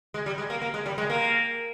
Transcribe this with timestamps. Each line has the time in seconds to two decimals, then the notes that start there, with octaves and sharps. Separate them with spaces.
0.14 G#3
0.26 G3
0.38 G#3
0.50 A#3
0.62 A#3
0.74 G#3
0.86 G3
0.98 G#3
1.10 A#3